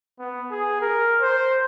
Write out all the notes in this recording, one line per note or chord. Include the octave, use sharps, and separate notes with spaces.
B3
G#4
A#4
C5